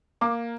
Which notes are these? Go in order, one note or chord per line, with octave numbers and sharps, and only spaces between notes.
A#3 D6